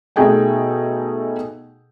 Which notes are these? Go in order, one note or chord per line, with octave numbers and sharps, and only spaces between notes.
B2 A3 D#4 G#4 G5 G#5